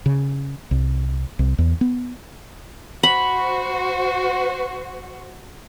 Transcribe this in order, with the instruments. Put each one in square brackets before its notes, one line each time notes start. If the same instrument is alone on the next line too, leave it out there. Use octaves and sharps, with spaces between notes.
[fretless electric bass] C#3
C2
C2
E2
B3
[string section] F#4 C5 [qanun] B5